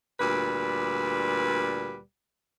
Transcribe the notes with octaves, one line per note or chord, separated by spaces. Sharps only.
D2 A#2 G3 B4